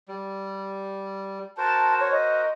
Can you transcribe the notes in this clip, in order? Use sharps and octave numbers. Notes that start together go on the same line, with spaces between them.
G3
F#4 A#4 C5 A5
C#5
D#5